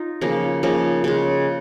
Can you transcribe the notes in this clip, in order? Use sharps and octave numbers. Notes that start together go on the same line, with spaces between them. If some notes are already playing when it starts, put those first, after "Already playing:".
Already playing: D#4 F4
C#3 F3 A#3
C#3 F3 A#3 D#4
C#3 G#3